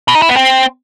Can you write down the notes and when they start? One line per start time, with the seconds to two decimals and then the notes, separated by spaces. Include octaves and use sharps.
0.08 B2
0.15 D#4
0.22 E4
0.29 B3
0.36 C4